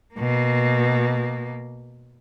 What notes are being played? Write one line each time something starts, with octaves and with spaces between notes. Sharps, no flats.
B2 A#3